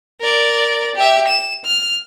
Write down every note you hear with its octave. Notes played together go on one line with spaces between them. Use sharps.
A#4 D5
G4 E5
E7
F6